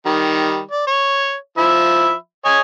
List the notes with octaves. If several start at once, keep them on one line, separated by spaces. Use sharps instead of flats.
D#3 G3
D5
C#5
F3 E5 B5
C#5 D#5 G#5